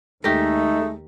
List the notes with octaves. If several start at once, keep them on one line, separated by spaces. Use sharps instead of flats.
D#2 G#3 A3 D#4 G4 A#4